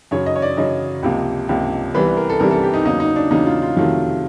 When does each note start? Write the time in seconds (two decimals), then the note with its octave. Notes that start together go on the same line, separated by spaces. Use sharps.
0.11 F#2 C#3 F#3 C#5
0.26 D#5
0.36 C#5
0.42 D5
0.57 F#2 C#3 F#3 D#5
1.03 C#2 C3 F3 A#3
1.49 C#2 C3 F3 A#3
1.94 C2 C3 E3 G3 B3 B4
2.17 A#4
2.29 A4
2.40 C2 C3 E3 G3 B3 A#4
2.51 A4
2.63 G4
2.74 D#4
2.85 E2 C#3 F#3 A#3 D#4
3.00 D#4
3.16 D4
3.31 E2 C#3 F#3 A#3 D#4
3.46 F4
3.62 F4
3.77 F2 C3 D#3 F#3 A3 F4